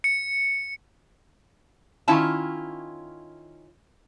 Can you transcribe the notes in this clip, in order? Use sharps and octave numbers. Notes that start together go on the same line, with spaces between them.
C#7
D#3 C#4 E4 F4 C#5 A5